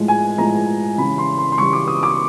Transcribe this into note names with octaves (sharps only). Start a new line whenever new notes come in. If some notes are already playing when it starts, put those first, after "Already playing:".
Already playing: A2 F3 G#3
G#5
A2 F3 G#3 A#5
C#3 E3 G3 B5
C6
C6
C6
C#3 E3 G3 C#6
D6
D#6
D6